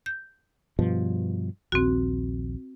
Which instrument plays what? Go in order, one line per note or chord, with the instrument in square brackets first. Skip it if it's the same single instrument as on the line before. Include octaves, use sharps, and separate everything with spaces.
[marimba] G6
[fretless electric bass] G2 B2 F3
[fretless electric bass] A#1 D#2 [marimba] C4 F#4